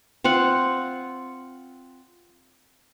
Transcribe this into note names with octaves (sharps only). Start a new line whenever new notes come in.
C4 F4 F#5